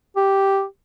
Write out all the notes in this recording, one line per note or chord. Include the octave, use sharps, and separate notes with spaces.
G4